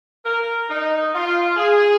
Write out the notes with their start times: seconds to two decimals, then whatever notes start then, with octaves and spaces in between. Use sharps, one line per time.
0.26 A#4
0.69 D#4
1.14 F4
1.57 G#4